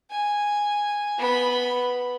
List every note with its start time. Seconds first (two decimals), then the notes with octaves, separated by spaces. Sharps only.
0.10 G#5
1.18 B3 B5